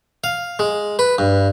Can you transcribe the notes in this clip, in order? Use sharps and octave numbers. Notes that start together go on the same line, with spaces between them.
F5
G#3
B4
G2